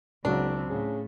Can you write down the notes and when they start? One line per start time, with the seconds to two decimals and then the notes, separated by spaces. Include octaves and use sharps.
0.25 F#1 C#2 C#3 F#3 C4 D4
0.70 A2 C#3